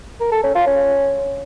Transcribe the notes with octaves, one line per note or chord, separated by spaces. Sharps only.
A#4
A4
C#4
F4
C#4